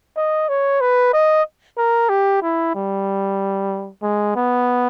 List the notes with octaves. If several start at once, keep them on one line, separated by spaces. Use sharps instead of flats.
D#5
C#5
B4
D#5
A#4
G4
E4
G3
G#3
B3